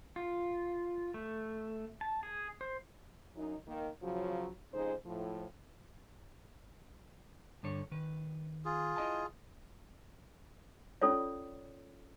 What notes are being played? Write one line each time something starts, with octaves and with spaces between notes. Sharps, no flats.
F4
A3
A5
G#4
C5
F#2 D#4
D#3 A#3
C#3 F3 F#3
F2 C#3 G#3 D#4 C5
A2 F3
G2 D3 C#5
D#3 B4
F4 G#4
E4 D#5 A5
C#4 F4 A4 C#5 D5